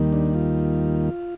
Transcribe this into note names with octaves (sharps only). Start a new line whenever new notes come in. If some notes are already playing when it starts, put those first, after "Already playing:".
Already playing: D#2 D#3 G3 A#3
D4
F4